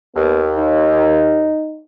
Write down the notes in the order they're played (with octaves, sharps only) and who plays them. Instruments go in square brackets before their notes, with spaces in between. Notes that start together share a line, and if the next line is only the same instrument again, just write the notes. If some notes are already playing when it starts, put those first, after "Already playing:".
[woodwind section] D#2 [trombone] B3
[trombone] D#4